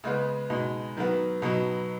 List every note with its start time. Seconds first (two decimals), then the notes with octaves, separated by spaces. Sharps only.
0.04 C#3 G#3 B3
0.50 B2 G#3 D#4
0.97 D#3 F#3 B3
1.42 B2 F#3 B3 D#4